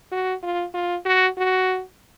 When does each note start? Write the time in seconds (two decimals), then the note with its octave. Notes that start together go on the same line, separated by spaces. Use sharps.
0.12 F#4
0.43 F4
0.74 F4
1.05 F#4
1.37 F#4